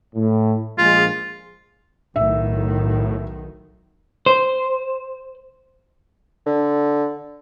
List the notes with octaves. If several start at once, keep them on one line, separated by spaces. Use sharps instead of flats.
A2
A#1 G#3 F4
B1 A2 D#3 E5
C5
D3